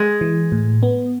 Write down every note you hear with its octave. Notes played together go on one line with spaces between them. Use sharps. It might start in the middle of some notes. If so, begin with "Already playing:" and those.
Already playing: G#3
E3
A2
B3